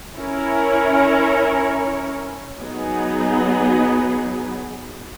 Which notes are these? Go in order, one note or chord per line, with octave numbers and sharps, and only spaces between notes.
C#4 E4 A#4 C#5
F#3 B3 D#4 G#4